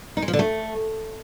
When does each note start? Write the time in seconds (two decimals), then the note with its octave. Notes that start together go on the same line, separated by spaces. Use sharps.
0.17 D#4
0.22 G#3
0.28 F3
0.33 D3
0.39 A3